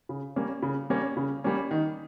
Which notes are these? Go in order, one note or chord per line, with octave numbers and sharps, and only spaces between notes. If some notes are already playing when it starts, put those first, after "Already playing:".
C#3
G3 A#3 C#4
C#3
G3 A#3 C#4
C#3
G3 A#3 C#4
D#3